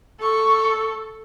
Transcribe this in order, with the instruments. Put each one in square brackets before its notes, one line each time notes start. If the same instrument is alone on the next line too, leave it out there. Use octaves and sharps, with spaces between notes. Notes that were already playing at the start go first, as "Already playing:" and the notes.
[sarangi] A4 [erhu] C#6